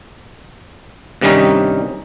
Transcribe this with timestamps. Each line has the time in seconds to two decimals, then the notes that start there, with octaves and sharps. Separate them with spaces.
1.21 G2 C3 D#3 G3 C#4 D#4